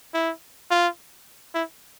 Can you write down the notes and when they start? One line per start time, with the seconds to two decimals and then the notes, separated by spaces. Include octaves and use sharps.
0.14 E4
0.71 F4
1.54 E4